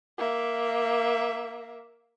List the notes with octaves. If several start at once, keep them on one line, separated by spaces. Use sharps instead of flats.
A#3 E5